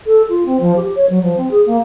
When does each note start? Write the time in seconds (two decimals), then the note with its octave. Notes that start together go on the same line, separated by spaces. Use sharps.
0.06 A4
0.29 F4
0.45 C4
0.60 F3
0.76 G4
0.95 C#5
1.09 F#3
1.22 F3
1.37 C4
1.51 G#4
1.66 A#3